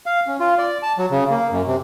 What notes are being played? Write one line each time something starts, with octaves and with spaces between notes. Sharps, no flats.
F5
C#4
F4
D5
A5
F#3
C#3
A#3
F#2
C3